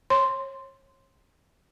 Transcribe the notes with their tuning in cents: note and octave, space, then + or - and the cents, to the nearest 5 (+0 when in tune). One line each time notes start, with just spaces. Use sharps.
C#5 -35 C6 -5